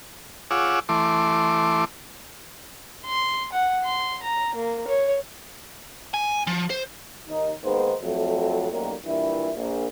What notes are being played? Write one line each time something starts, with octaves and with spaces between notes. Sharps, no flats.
F4 G#4 C#5 F#5 D6 E6
E3 A3 C6 D6
C6
F#5
C6
A#5
A#3
C#5
G#5
F3
C5
D#2 D#4
D#3 G#3 A#3 B3 D#4 C5
F2 F#3 A3
B1 F#2 A2 D#3 G3 A#3
G2 A#2 E3 E4
A#1 A#2